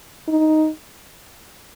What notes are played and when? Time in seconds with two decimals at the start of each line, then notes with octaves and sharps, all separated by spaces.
0.28 D#4